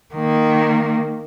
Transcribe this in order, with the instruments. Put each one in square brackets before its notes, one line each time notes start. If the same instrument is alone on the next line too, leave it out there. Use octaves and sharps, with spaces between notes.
[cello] D#3 A#3